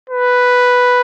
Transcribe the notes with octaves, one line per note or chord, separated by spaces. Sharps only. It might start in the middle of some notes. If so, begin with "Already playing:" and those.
B4